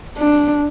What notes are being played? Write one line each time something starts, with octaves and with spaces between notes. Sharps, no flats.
D4